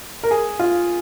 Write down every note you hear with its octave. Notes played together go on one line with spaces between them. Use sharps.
A#4
G#4
F4